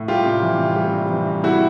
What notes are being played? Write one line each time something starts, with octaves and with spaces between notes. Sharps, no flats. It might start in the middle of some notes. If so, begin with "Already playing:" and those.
Already playing: A2
G3 F4 G4
C3
E3
C3
G3
C3
E3
C3
G3 E4 F#4